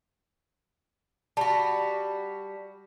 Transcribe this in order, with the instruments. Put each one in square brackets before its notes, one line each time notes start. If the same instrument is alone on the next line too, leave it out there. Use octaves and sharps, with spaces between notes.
[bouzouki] G3 F#4 [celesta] A5